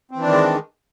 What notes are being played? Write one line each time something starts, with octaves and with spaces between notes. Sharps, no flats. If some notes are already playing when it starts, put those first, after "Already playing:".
D#3 E3 G#3 C4 D4